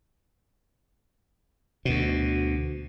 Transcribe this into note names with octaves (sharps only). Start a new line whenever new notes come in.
D2 B2